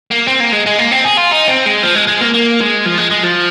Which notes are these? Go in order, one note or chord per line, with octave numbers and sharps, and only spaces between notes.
A#3
C4
A#3
G#3
G#3
A#3
C4
G#4
F4
D#4
C4
G#3
F3
G#3
G#3
A#3
A#3
G#3
F3
G#3
G#3
F3